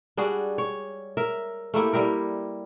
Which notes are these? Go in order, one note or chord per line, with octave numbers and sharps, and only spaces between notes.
G3 D4 F#4 G#4
C#5
A#4 E5
A3 A#3 E4 G4
G3 E4 G4 A#4